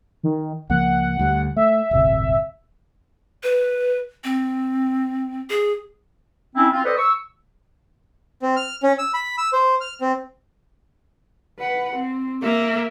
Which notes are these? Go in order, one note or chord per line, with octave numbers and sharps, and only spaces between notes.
D#3
C#2 F3 A#3 F#5
D2 G3
A3 E5
D1 G1 C3
B4
C4
G#4
C4 C#4 E4
C4 F4
A4 B4 C5 D5 D#5
C#6 E6
C4
F6
C#4
E6
B5
E6
C5
F6
C4
B4 F#5
C4
A#3 E5